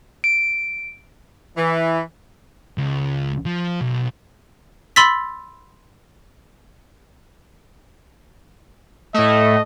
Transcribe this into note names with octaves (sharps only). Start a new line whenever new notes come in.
D7
E3
C#2
F3
B1
B5 C6 E6 A6 B6
A2 A3 D#5